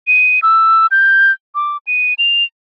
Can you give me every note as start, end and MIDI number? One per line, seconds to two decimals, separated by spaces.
0.07 0.40 99
0.42 0.87 88
0.91 1.32 91
1.55 1.77 86
1.87 2.14 99
2.18 2.44 101